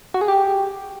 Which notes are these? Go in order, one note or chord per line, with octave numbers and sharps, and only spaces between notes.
F#4
G#4
G4